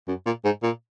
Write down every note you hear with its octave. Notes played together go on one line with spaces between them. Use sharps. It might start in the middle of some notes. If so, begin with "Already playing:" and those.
F#2
A#2
G#2
A#2